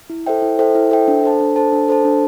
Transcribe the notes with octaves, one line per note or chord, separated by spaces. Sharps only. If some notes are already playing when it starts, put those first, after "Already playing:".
E4
A4 C5 E5 G5
E4
A4 C5 E5 G5
E4
A4 C5 E5 G5
D4
A4 C5 A5
D4
A4 C5 A5
D4
A4 C5 A5
D4